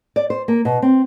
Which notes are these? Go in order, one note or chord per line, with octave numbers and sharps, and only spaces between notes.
D5
C5
A#3
B2
C4